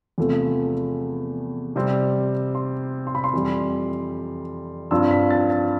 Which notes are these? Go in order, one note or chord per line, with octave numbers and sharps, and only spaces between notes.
E2 C3 F3 A3
C3 G3 C4
C6
C6
B5
C6
F2 E3 G3
G2 F3 C4 F4 E6
B6
A6
A6